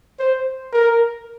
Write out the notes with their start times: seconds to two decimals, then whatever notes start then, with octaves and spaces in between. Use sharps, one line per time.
0.19 C5
0.72 A#4